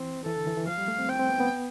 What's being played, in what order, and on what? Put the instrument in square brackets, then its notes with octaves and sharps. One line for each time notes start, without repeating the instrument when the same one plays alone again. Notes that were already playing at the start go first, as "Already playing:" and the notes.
Already playing: [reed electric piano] E3 [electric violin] C4
[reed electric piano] E3 [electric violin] A4
[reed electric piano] D3
E3
E3
[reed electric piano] F3 [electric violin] F5
[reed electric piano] G3
A3
C4
[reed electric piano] C4 [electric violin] G5
[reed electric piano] C4
B3
B3